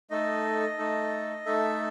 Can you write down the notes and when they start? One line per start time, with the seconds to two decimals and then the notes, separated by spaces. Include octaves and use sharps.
0.11 A3 D#4 A4 D#5
0.78 A3 D#4 A4
1.46 A3 D#4 A4 E5